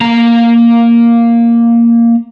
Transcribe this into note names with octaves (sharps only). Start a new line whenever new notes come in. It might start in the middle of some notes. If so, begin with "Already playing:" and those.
A#3 A#5